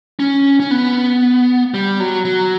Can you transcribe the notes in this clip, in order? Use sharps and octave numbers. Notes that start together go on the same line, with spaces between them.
C#4
C#4
B3
G3
F#3
F#3